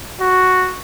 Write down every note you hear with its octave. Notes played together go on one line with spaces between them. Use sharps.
F#4